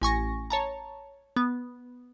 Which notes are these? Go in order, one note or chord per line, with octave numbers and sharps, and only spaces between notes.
A1 G#5 C#6 A#6
C#5 A5 A#5
B3